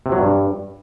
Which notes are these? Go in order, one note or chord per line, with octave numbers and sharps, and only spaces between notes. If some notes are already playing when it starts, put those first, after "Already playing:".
C3
F#3
G2